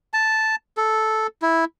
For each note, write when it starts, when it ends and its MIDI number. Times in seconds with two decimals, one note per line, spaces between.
0.14 0.55 81
0.77 1.27 69
1.42 1.65 64